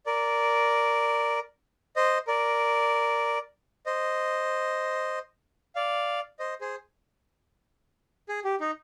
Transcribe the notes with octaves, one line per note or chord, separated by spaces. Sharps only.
A#4 D5
C5 D#5
A#4 D5
C5 D#5
D5 F5
C5 D#5
G#4 C5
G#4
G4
D#4